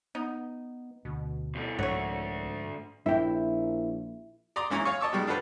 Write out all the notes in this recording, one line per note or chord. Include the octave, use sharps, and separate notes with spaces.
B3 D#4
D2 B2
E2 A3
C2 G#2 D3 F3 F#3 A3 C4 C#5
A#1 E4 E5 G5
D5 A#5 C6 D6 D#6
G#2 E3 C#4 A#5
C#5 F5 G#5 C#6
D#5 A5 C#6 D6 E6
B2 D#3 G3 G#3
D4 F4 F#4 A4 B4 C5